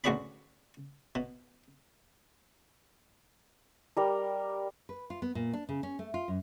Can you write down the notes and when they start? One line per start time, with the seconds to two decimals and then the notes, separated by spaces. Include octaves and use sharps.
0.04 A1 D2 F#4 G#4 D5 B5
1.15 B2
3.97 G3 A#4
4.89 B4
5.10 F4
5.22 B3
5.35 A#2
5.53 D4
5.69 C#3
5.83 C#4
5.99 A3
6.14 F4
6.28 F#2